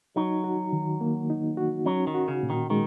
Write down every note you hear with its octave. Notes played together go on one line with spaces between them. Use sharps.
F#3 D#4
F#4
D#3
A#3
D#4
F#4
F#3 C#4
D#3
F#4
C#3
A#2
D#3
D#3 G#3